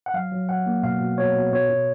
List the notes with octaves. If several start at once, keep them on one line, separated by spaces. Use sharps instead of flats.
F#5
F#3 F5
F#3
F#3 F#5
A#3
B2 F5
B2
B2 C#5
B2
B2 C#5
B2